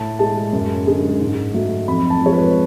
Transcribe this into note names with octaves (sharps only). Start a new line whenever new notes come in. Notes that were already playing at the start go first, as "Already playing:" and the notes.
Already playing: A2 A5
G#3 A5
F#2
D3 G#3
G#2
F#3 A3
F2 B5
A5
F3 G#3 C#5
B4